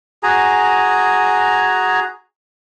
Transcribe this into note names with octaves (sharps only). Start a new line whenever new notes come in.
F#4 G#4 G#5 A#5